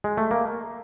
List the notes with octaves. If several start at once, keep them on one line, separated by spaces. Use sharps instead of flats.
G#3
A3
A#3